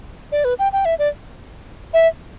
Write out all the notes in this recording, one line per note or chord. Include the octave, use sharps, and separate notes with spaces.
D5
B4
G5
G5
E5
D5
E5